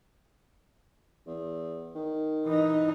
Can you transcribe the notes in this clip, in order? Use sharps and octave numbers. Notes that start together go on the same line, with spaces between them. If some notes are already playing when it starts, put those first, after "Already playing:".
E2
D#3
E3 D#4